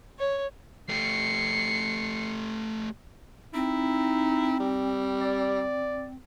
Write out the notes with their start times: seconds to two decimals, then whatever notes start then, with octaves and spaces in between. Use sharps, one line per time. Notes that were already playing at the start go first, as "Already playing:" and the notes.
0.19 C#5
0.89 A3 G4 C7 C#7
3.54 C4 D#4 E4
4.60 G3
5.21 D5